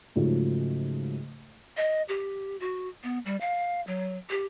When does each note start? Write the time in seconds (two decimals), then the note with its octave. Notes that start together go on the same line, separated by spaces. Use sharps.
0.16 G#2 C#3 F3 F#3 A3
1.77 D#5
2.09 G4
2.60 F#4
3.04 B3
3.26 G3
3.41 F5
3.87 F#3
4.29 G4